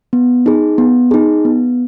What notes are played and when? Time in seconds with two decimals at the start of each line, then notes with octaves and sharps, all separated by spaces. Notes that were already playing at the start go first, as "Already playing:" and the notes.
0.13 B3
0.46 D#4 G#4
0.78 B3
1.11 D#4 G#4
1.45 B3